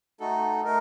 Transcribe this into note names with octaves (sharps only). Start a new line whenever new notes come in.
A3 D#4 F#4 A4
A3 D#4 A#4